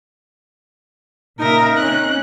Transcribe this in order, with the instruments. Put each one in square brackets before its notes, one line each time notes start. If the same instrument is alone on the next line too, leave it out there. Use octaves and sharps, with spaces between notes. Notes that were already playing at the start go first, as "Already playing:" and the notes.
[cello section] A#2 C#3 E5 [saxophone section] D#4 [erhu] A#4
[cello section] A#3 C4 C#4 [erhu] F#6